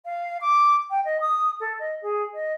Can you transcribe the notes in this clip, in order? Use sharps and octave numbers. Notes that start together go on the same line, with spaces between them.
F5
D6
G5
D#5
D#6
A4
D#5
G#4
D#5